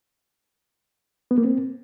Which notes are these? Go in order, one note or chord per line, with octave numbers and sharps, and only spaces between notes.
B3
A#3
C4